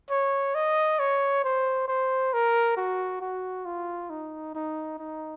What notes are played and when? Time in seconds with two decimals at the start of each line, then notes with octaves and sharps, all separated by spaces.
0.10 C#5
0.55 D#5
0.99 C#5
1.44 C5
1.88 C5
2.33 A#4
2.77 F#4
3.21 F#4
3.65 F4
4.10 D#4
4.55 D#4
4.99 D#4